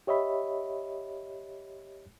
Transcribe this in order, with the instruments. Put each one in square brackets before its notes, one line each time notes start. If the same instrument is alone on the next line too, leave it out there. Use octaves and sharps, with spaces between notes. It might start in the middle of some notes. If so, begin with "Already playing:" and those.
[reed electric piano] G4 C#5 D#5 E5 B5